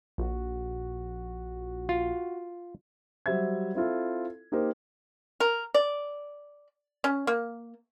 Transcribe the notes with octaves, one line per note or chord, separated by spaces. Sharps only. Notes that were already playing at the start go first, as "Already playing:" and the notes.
A#1 F#4
F4
F#3 G3 C5 E5 G#6
C4 E4 F4 A4
A#3 D#4 G4 A#4 C5
A#4
D5
C#4
A#3